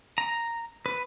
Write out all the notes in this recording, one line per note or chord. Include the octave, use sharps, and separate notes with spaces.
A#5
B4